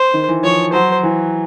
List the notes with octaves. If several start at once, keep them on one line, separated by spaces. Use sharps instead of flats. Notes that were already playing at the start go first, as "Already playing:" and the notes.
Already playing: C5
D#3
E3
F3 C#5
F#3 C5
E3